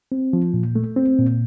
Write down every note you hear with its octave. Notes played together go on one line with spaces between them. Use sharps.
C4
F3
A#2
A3
C4
A#2